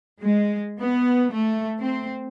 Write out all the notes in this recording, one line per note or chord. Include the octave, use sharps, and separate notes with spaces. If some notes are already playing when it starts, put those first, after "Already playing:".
G#3
B3
A3
C4